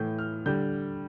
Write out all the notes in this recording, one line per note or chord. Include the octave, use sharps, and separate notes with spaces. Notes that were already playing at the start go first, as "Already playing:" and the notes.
Already playing: A2 E3 A3 G6
F6
D3 G3 G6